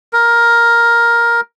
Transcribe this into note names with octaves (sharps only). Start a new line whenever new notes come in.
A#4